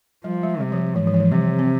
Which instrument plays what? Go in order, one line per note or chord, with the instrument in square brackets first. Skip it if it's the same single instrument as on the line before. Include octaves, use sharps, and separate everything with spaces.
[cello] F3 [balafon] G3
[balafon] G#3
[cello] C3 [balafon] G3
[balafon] F3
[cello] G#2 [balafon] E3
[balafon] F3
E3
F3
[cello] C3 [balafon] G3
[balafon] C4